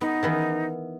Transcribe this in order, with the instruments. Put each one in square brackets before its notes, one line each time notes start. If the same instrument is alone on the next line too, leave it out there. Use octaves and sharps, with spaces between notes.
[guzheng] B3 [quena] D#4
[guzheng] D#3 E3 B3